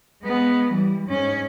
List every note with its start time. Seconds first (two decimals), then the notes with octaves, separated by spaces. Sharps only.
0.23 G#3 B3
0.71 E3 G3
1.07 G#2 C#4